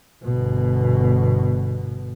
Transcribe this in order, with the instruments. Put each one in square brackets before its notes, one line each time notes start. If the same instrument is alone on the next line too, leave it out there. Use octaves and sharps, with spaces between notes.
[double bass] G1 B2